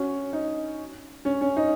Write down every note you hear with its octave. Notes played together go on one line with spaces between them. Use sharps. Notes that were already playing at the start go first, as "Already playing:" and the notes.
Already playing: C#4 F#4
D#4
C#4
C#4
D#4